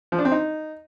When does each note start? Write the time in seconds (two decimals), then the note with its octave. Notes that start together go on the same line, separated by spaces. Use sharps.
0.12 F3
0.19 D4
0.25 C4
0.32 D#4